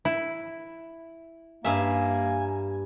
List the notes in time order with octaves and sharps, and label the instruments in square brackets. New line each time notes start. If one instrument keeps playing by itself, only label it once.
[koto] E4
[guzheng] G2 E5 [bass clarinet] A#3 [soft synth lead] G#5